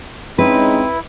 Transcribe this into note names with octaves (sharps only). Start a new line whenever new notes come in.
G#3 C4 C#4 D#4 E4 B4